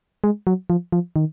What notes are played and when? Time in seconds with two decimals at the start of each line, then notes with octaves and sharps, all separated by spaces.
0.24 G#3
0.47 F#3
0.70 F3
0.92 F3
1.16 D#3